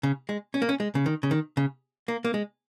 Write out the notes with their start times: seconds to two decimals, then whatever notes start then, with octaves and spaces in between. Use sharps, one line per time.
0.03 C#3
0.29 G#3
0.54 C#4
0.62 A#3
0.69 C#4
0.80 G#3
0.95 C#3
1.06 D#3
1.23 C#3
1.31 D#3
1.57 C#3
2.08 A#3
2.25 A#3
2.34 G#3